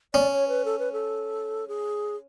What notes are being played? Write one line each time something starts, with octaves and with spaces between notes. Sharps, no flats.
C#4 D5
C#5
B4
A4
B4
A4
G#4